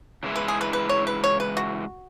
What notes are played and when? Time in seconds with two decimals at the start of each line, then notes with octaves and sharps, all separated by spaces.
0.23 C#3 E3 G#3 E4
0.36 B4
0.48 G#4
0.61 B4
0.73 B4
0.89 C#5
1.07 B4
1.24 C#5
1.40 B4
1.57 F#4